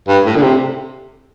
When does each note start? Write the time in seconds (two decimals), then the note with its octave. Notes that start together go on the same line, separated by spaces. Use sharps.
0.08 G2
0.26 A2
0.36 D3
0.42 C3